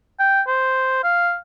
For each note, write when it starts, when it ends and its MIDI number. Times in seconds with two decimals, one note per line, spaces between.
0.19 0.42 79
0.47 1.02 72
1.04 1.36 77